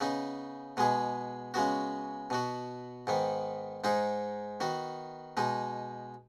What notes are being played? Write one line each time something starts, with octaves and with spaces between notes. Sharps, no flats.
C#3 B3 D#4
B2 G#3 B3 G#4
C#3 G#3 B3 F#4
B2 B3 F#4
G#2 D#3 B3
G#2 G#3 D#4 G#4
D#3 B3 F#4
B2 G#3 D#4